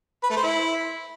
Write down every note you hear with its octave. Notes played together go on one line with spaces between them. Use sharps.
B4
A3
C5
E4